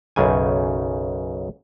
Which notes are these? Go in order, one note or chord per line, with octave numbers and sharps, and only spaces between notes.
B1 F#2 C#3 G#5